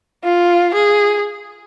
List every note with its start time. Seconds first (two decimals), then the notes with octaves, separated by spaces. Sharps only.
0.24 F4
0.75 G#4